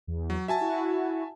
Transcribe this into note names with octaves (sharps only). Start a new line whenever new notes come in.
E2
F#3
F#4 E5 G#5 A5
E4 F#4